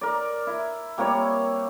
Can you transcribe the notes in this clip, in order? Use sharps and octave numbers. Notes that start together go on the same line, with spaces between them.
A#4 D5
E4
G3 A#3 C4 C#5